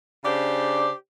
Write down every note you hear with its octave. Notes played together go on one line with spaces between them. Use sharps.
C#3 D4 G4 C5 D5